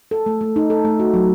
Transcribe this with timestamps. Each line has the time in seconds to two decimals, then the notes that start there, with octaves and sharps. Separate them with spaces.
0.11 A4
0.26 A3
0.41 A3
0.56 D#4
0.70 A4
0.85 A3
0.99 F#4
1.14 F#3